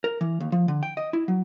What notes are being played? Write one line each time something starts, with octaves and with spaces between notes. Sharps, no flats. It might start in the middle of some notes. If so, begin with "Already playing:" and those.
A#4
E3
D#2
F3
D3
G5
D#5
E4
F#3